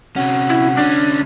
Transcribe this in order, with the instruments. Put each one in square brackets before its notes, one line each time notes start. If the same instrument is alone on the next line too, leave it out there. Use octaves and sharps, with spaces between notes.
[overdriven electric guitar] C3 C#4 [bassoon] F#4
[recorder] E4
[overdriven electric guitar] D2 C#4 [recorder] D4